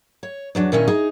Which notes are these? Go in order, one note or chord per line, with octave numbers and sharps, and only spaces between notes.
C#5
E2 F#3 D4
A#2 D#3 C#4 E4 D#5
D#4 G#4